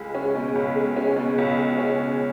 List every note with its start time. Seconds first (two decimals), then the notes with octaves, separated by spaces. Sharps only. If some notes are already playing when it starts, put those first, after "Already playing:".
Already playing: C#2 G#3
0.14 C#4
0.35 B2
0.55 C#2
0.76 G#3
0.96 C#4
1.16 B2
1.38 C#2
1.58 G#3
1.78 C#4